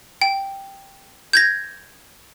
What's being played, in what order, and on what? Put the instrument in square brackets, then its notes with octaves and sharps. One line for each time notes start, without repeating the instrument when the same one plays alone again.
[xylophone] G5
G6 G#6 A#6